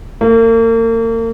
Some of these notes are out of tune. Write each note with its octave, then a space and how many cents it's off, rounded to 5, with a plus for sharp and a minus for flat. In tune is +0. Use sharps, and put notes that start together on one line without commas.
A#3 -40